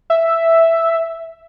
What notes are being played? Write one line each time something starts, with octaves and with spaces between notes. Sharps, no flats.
E5